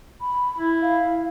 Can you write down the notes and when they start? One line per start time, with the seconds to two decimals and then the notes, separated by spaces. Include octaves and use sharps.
0.21 B5
0.58 E4
0.82 F5